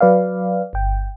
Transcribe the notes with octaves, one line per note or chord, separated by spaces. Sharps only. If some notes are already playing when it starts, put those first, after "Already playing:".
F#3 B4 D5 F5
G1 G5